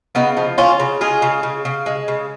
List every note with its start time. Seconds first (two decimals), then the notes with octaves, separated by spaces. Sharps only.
0.15 C#3 B3 D#4
0.37 F3
0.58 C#3 C#4 F4
0.80 C#3
1.01 G#3 F4 G#4
1.22 C#3
1.43 C#3
1.65 C#3
1.86 G#3
2.08 C#3